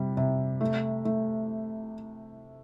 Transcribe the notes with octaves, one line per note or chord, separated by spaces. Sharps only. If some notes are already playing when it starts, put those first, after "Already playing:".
Already playing: C3 G3
C3
A3
A3